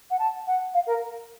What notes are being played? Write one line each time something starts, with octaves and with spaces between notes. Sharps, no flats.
F#5
A5
F#5
F5
A#4